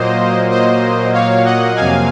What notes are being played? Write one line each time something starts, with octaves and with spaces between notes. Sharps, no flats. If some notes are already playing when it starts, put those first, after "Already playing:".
Already playing: A#2 F#3 A#3 C5 D#5
C5 D#5
C#5 F5
D#5 F#5
F2 C3 F#3 A#3 F5 G#5